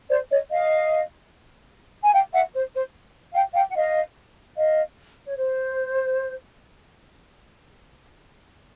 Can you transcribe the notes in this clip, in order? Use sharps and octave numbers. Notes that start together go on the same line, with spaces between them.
C5 D5
C#5 D#5
D#5 F5
G#5
F5 G5
E5 F#5
C5
C5
F5 G5
F5 G5
F#5
D#5 F5
D#5 F5
C#5
C5